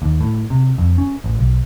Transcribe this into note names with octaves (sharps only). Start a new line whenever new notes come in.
D#2
A2
C3
F2
C#4
A1
B1